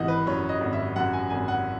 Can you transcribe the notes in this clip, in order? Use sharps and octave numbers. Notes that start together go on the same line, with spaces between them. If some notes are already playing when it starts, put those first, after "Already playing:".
Already playing: G#1 E3 D#5 F#5
B4
F#2 C#5
D#5
G#1
E5
F#2 F#5
G#5
G#1 G#5
F#5